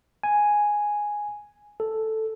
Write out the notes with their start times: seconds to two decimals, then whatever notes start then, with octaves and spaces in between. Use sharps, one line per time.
0.23 G#5
1.80 A4